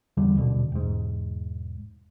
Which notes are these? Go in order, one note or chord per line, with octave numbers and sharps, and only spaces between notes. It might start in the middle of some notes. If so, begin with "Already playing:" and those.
E2 D3 G3
D#1 B2 D3
E1 G#2